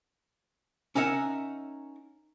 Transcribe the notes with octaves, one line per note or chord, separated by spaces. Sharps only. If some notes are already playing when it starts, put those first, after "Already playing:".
C#4 D#4 A#4 E5 F#5